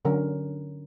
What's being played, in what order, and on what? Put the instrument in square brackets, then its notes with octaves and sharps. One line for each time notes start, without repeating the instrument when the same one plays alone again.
[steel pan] D3 F#3 C#4 A#4